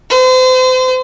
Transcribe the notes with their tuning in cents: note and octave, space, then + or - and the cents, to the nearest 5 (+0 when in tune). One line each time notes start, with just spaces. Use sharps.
C5 -35